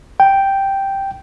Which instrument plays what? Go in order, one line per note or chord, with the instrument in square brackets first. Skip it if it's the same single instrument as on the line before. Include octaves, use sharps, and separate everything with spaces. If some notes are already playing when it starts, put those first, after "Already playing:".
[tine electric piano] G5